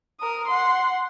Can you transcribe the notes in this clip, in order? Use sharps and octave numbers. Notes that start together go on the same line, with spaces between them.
A#4 D#6
F#5 C6